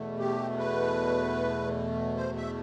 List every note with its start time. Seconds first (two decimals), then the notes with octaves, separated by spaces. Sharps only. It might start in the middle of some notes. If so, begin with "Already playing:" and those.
Already playing: E2 B2 A3
0.19 G4
0.58 B4
2.17 C5
2.37 E5